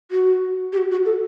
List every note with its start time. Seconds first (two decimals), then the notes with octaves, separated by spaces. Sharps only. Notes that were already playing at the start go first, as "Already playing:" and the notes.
0.11 F#4
0.73 G4
0.78 F#4
0.91 F#4
1.06 A4